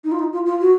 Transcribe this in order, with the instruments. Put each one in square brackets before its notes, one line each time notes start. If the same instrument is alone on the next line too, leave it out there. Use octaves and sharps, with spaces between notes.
[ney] D#4
F4
D#4
F4
F4
F#4